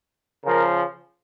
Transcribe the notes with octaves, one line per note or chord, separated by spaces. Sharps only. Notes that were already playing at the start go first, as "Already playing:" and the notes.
C#3 F3 A#4